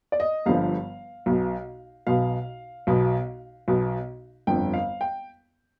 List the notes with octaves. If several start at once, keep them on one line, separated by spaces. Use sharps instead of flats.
D5
D#5
G1 G2 D3 F3 F5
B1 B2
B1 B2 F5
B1 B2
B1 B2
G1 F2 D3 G5
F5
G5